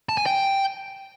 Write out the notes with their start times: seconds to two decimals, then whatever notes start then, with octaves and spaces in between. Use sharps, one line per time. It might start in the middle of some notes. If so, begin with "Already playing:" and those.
0.09 A5
0.18 G#5
0.26 G5